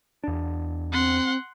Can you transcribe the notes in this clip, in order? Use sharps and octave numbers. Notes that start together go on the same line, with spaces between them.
E2 D4
C4 F#5 C6